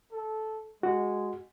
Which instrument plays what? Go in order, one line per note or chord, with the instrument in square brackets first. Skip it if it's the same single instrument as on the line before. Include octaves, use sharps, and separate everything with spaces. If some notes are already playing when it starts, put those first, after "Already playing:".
[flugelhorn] A4
[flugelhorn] G#3 [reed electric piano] F#4